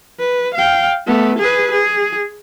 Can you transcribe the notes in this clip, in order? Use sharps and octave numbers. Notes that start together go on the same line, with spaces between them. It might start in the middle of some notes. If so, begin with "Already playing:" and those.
B4
F5 G5
A3 B3
G#4 B4
G#4